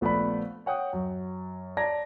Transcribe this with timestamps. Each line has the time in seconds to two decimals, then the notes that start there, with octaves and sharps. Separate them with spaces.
0.01 A#1 A3 B3 F4 D5 B5
0.66 C#5 F#5 G5 D#6
0.93 F#2
1.77 D5 A5 A#5 G#6 A#6